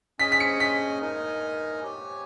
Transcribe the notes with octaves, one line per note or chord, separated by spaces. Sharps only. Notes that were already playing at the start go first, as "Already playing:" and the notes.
C#4 G#4 D#5 G#5 B6
B6
C#7
B6
D#4 A#4 D#5 G#5
G4 C#5 G#5